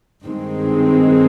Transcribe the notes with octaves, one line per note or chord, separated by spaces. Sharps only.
G2 D#3 G#3 C4